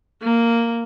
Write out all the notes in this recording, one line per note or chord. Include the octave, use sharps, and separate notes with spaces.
A#3